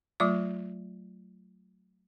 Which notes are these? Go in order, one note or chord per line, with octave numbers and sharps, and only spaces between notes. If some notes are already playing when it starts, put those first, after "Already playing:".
F#3 A3 F4 D6